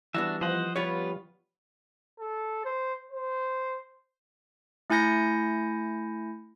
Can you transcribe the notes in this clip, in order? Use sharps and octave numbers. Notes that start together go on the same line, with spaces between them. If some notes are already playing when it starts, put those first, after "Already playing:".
E3 G3 B3 D4 F#4 E5
F3 C5 D#5 F#5
G3 B3 F4 G4 B4 C#5
A4
C5
C5
A3 E4 G#5 G6 A#6 C#7